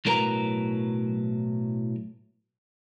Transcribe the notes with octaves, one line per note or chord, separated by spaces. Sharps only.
B1 A2 F#3 A#4 B4 A#5